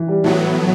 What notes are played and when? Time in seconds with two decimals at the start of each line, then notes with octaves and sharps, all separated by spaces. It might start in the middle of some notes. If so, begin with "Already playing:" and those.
Already playing: E3
0.08 G3
0.24 A2 E3 F#3 B3